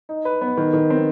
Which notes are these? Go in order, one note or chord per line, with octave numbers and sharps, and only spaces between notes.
D#4
B4
B3
D#3
D#3
C4